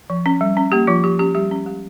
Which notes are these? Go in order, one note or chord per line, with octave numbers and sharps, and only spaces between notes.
F3
C#4
G3
C#4
A#3 G4
F3 F4
F3 G4
C#4 G4
G3 G4
C#4
G#3 G4